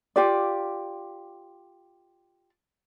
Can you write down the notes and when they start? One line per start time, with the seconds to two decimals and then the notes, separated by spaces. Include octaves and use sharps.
0.16 F4 G4 D5